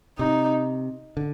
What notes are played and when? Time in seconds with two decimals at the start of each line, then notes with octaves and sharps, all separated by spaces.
0.18 C3 D#4
1.17 D3